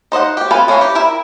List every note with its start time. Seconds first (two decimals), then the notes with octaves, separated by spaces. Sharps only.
0.12 D#4 C5 D#5 F#5
0.37 G4 G5
0.51 C4 A4 B4 F5 G#5
0.68 E3 C#4 B4 F5 A#5
0.81 G4
0.95 E4 A#4 E5